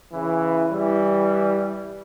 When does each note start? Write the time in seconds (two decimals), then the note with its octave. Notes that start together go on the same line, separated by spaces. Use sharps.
0.13 C#3 E3
0.70 E3 G3